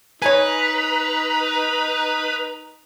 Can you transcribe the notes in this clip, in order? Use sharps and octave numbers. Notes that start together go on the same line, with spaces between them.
D#4 B4 C#5 G#5 A#5